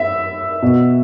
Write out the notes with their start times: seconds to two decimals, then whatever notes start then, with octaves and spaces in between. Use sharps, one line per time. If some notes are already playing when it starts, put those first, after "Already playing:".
Already playing: E5
0.62 B2